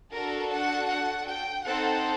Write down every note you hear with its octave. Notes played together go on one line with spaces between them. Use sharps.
D4 F#4 A4 A#4
F#5
F#5
G5
C4 D#4 A4 F#5